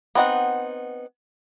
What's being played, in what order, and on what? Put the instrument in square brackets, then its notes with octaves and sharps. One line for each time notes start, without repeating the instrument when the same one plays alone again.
[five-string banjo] B3 C4 D#4 F#5